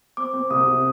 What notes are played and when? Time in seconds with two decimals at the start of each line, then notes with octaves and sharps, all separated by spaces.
0.17 C4 D6
0.33 C4
0.50 C2 D#6
0.67 C3